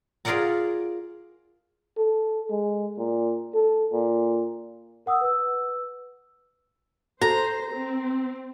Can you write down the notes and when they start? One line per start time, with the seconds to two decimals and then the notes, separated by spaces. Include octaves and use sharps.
0.25 F4 G#4 A#4 D5 F#5 A#5
1.97 A4
2.51 G#3
2.98 A#2
3.54 A4
3.93 A#2
5.06 A#4 F#5 D#6 E6
5.21 B4 E6
7.22 F#4 A4 C5 A#5
7.73 C4